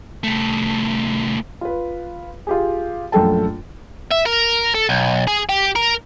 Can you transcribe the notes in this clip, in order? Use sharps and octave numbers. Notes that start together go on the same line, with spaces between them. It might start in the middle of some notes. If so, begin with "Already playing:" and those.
C2 A3
F4 B4
F4 G4 G#4
A#1 F#2 A3 A4 G5 A5
E5
A#4
A4
B1
G#4
G4
A#4